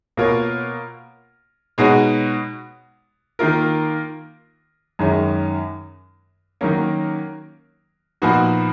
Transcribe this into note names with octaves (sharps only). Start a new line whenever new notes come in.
B2 A#3 F4 A#4 C#5
B2 G#3 D#4 F#4 C#5
D#3 A#3 F4 A#4
F#2 D#3 G#3 C#4
D#3 F#3 A#3 C#4
A#2 F3 B3 D#4 F#4